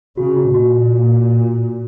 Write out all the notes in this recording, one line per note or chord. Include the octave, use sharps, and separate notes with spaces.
C#3 F#4
F#4
A#2 F#4
F#4